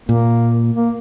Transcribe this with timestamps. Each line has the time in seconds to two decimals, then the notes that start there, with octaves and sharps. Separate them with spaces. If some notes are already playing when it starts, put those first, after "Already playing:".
0.09 A#2 A#3
0.75 A#3